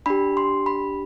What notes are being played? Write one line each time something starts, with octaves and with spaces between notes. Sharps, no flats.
D4 G4 B5
C6
B5